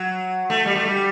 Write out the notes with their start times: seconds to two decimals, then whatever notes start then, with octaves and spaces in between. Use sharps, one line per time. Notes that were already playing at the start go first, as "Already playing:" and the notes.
Already playing: F#3
0.50 A3
0.66 G3
0.76 A3
0.85 G3